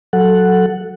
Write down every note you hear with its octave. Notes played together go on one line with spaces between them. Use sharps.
F#3 A4 F#5